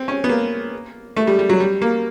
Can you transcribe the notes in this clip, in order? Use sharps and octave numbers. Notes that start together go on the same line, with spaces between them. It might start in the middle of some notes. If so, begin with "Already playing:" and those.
Already playing: C4
C#4
B3
A#3
A3
G3
G3
F#3
G3
A#3